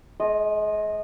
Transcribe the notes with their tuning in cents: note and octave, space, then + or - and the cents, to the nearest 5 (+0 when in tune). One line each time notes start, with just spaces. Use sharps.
G#3 +35 D#5 -15